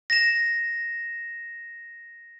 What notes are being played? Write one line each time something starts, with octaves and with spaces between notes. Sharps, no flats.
A#6 E7